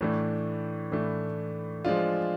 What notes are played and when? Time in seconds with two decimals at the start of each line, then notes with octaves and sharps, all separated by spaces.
0.01 A2 E3 A3 D4
0.92 A2 E3 A3 D4
1.85 F3 G#3 D4 F4